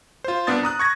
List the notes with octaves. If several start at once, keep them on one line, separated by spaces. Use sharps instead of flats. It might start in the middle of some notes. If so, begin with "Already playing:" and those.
F4 C5
C2 B3 D4 D#6 A6
A#5 D#6 F#6
C#6 G#6 A#6